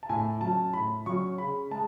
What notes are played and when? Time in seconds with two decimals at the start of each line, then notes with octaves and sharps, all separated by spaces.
0.03 A5
0.09 A2 G#5
0.41 F#3 C#4 A5
0.73 A2 B5
1.06 F#3 C#4 C#6
1.38 C#3 B5
1.71 G#3 A5